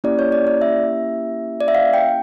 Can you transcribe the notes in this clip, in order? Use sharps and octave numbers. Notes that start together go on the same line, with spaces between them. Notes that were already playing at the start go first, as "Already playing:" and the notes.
A#3 C#4 E4 G4 D5
C#5
D5
D5
E5
D5
E5
F5
G5